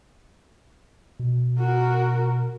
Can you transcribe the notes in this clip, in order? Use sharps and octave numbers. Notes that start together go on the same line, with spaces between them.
B2
F#4 A#4